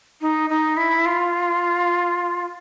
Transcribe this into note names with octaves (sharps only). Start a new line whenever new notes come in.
D#4
D#4
E4
F4